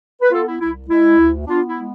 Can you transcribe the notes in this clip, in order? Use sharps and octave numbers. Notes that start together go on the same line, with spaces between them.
B4
B3 F4 A4
E4
C2 E4
G#3 E4
D2
B3 D4 F4
E4
G#3